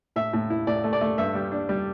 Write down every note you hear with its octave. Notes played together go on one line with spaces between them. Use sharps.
A2 E5
A2
E4
A2 D5
A3
D5
A3
G2 E5
G3
D4
G3